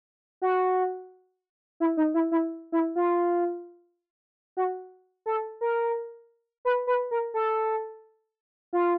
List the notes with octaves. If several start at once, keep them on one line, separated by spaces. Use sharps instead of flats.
F#4
E4
D#4
E4
E4
E4
F4
F#4
A4
A#4
B4
B4
A#4
A4
F4